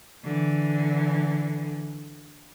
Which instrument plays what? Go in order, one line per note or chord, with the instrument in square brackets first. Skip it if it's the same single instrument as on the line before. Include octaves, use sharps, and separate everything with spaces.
[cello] D3 E3